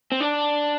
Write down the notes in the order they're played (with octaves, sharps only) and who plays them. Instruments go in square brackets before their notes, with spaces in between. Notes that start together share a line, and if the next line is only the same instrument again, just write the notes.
[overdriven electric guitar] C4
D4